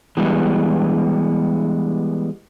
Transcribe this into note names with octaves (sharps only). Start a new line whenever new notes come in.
E3 G3 G#3 B3